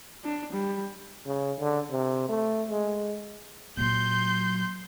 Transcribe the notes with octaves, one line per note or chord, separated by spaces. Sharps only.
D4
G3
C#3
D3
C3
A3
G#3
A#2 F#3 C6 G6